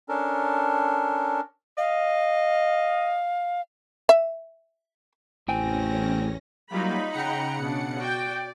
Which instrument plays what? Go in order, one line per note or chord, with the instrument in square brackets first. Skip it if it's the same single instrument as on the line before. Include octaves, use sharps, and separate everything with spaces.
[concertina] C#4 D4 A4 A#4
[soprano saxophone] D#5 [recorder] F5
[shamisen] E5
[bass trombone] A1 [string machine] E2 C#4 A#6 [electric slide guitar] A2 G5 G#5 [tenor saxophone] C4
[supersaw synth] F#3 G3 A#3 [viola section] D#4 B5 [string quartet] F4
[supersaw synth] C#3 F#5 C#7 [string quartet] G5 A#5
[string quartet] B2 D4
[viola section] F#4 G5 [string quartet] D5